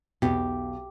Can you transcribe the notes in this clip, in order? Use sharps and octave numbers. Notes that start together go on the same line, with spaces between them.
B1 E2 B2 G4